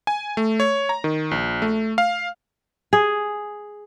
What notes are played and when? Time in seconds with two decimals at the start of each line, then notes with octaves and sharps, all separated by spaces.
0.07 G#5
0.37 A3
0.60 C#5
0.89 A#5
1.04 D#3
1.31 A#1
1.62 A3
1.98 F5
2.93 G#4